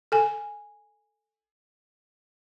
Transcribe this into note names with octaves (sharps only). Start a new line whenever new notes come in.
A4 G#5